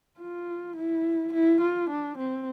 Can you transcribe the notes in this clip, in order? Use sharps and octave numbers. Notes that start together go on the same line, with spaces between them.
F4
E4
E4
F4
D4
C4